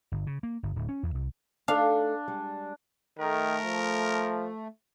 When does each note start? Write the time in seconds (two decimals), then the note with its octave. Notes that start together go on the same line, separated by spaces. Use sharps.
0.12 G1
0.27 C#3
0.43 A#3
0.63 G1
0.76 D1
0.89 C#4
1.03 E2
1.15 C2
1.68 A3 D4 D#4 A4 F5
2.28 G3 G#3
3.19 D#3 A3 A#4
3.64 F3